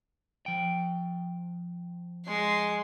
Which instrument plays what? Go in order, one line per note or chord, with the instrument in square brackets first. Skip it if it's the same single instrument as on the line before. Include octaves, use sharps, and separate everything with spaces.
[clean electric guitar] F3 G5
[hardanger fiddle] G#3 C6